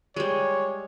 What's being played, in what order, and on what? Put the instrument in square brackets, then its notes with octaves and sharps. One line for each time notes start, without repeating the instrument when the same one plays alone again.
[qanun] G3 G#3 [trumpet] C#5